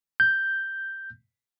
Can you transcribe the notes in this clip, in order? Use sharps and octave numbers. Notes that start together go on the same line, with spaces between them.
G6